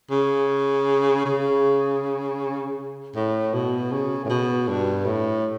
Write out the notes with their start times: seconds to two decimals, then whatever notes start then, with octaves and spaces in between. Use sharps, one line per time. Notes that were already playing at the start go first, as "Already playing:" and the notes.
0.11 C#3
1.25 C#3
3.15 A2
3.54 B2
3.92 C#3
4.24 A2
4.29 B2
4.68 G2
5.06 A2